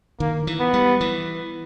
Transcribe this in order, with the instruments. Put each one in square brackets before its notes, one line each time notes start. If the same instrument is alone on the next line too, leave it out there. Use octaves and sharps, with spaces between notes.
[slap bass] D#3 [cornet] A#3
[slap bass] E3
[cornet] B3
[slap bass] G3
E3